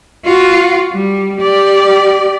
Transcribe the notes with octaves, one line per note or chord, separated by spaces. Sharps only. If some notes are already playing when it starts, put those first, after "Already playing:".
F4 F#4
G3
G4 D5